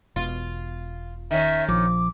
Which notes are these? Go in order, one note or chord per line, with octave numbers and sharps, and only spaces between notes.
E1 B2 F4
D#3 C#4 E5
A#1 F3 D6